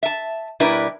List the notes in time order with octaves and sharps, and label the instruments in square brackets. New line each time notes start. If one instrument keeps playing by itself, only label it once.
[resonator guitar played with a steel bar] E5 A5
B2 G3 D4 E4 A#4 B4